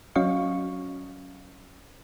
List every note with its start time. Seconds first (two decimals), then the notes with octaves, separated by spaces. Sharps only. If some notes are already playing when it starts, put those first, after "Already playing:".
0.16 F#3 C#4 F#4 D#5 F5 C#6